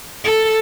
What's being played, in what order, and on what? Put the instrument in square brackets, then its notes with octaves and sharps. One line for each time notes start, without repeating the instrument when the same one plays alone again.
[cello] A4